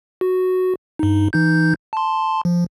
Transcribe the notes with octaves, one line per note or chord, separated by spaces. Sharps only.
F#4
G2 D#4
E3 D#4 G6
A5 C6
F3